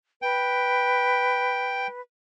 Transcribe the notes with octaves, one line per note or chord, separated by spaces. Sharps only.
B4 G5